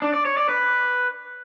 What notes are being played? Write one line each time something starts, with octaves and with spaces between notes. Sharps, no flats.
D4
D5
C#5
D5
B4